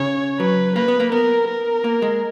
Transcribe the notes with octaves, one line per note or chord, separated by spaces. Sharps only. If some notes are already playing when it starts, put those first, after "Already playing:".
Already playing: C#3 C#5
F#3 B4
A#3 B4
B3
A#3
B3 A#4
A#4
A#3
G#3